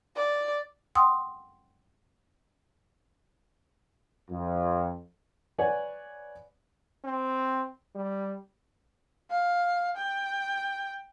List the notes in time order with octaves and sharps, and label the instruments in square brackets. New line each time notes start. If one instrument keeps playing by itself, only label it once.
[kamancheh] D5
[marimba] F#5 G5 C6 D#6 E6
[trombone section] F2
[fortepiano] B4 C#5 D5 F#5 G#5
[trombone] C4
G3
[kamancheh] F5
G5